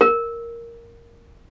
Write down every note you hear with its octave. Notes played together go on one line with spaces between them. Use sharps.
A#4